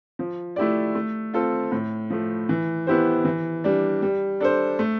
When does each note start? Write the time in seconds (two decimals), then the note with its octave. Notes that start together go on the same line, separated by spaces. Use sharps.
0.19 F3
0.56 A3 E4 G4 D5
0.95 A3
1.34 C4 F4 A4
1.72 A2
2.10 F3 A3
2.49 E3
2.87 B3 E4 G4 C5
3.25 E3
3.64 G3 D4
4.02 G3
4.40 D4 A4 C5
4.79 A3